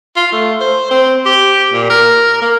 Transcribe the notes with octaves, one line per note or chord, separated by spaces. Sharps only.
F4
A3
C5
C4
G4
A#2
A#4
A#3